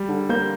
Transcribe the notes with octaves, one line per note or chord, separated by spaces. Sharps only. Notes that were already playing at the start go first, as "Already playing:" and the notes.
Already playing: G3
D3
A#3 G6